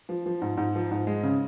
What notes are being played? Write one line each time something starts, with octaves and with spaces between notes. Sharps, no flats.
F3
F3
G#2
G#2
F3
G#2
G#3
C#3